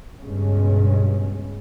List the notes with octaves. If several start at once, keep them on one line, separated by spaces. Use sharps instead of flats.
C#2 G2 B2 G#3 C#4